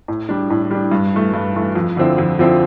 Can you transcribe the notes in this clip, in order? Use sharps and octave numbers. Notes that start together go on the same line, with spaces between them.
A2
G3 D4
A2
G3 D4
G2
E3 A3
G2
E3 A3
F2
D3 F3 C4 E4
F2
D3 F3 C4 E4